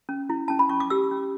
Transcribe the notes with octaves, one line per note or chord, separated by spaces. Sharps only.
C#4
E4
C#4 A5
B5
C#4 C#6
D6
G4 E6
C#4